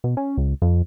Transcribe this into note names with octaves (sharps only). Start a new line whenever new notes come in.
B2
C#4
C#2
F2